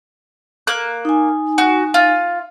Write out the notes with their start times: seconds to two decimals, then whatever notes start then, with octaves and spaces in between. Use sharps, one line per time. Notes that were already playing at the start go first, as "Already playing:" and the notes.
0.67 A#3 F#6
1.05 D#4 G#5
1.58 F#4
1.94 F4